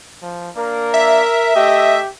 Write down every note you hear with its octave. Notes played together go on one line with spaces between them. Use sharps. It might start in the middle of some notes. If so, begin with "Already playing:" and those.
F3
A#3 D4 A#4
E5
A3 G4 D#5